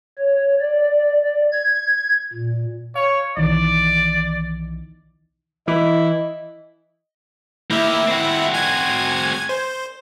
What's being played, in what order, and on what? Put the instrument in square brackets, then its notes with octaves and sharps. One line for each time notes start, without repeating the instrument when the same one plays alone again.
[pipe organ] C#5
D5
D5
G#6
A#2
[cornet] C#5 [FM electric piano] F5
[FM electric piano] B1 D#3 E3 [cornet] D5
[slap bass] E3 [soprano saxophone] E4 [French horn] D#5
[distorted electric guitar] A#3 G4 [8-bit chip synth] E4 E5
[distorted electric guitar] C4 F#4
[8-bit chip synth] G#5 G#6
C5